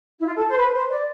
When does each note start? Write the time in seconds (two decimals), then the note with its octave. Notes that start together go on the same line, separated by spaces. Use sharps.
0.20 E4
0.26 F4
0.37 A4
0.49 C5
0.58 B4
0.75 C5
0.90 D5